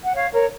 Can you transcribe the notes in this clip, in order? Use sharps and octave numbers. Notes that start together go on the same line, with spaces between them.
F#5
C#5 F5
A#4 C#5